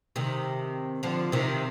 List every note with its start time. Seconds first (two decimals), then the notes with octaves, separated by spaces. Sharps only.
0.16 C3 D#3
1.03 D3 F3
1.32 C3 D#3